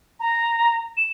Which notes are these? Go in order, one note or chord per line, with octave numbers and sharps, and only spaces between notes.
A#5
E7